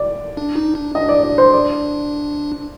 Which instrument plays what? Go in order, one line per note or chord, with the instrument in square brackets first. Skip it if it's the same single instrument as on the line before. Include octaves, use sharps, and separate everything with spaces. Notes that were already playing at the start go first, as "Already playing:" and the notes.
Already playing: [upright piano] D5
[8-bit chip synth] D4
D#4
D4
[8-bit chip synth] D4 [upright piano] D#5
[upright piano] D5
D5
C5
D5